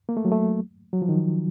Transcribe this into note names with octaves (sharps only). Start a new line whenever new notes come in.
A#3
A3
F#3
A3
F#3
F3
D#3